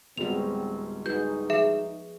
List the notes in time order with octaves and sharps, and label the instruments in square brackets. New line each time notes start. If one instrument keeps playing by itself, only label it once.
[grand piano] D1 G3 G#3 [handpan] B3 F#4 [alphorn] C4 [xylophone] F7
[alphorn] D#4 [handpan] F#4 G#4 B4 [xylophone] G6
[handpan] F3 [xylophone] G#4 E5